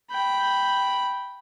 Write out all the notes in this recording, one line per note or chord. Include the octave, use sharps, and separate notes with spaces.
G5 B5